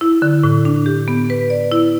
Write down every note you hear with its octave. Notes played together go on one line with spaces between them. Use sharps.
E4
D3
A2
D4
G4
B3
B4
D5
E4